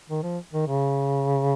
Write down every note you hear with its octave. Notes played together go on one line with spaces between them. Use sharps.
D#3
F3
D#3
C#3